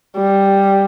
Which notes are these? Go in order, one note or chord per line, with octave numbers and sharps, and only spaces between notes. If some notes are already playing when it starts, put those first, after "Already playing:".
G3